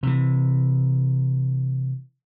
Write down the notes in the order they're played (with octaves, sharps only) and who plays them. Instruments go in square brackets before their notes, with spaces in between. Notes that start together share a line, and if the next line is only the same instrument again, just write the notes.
[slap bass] C3 E3